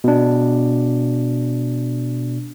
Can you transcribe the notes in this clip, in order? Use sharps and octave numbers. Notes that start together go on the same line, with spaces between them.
B2 D4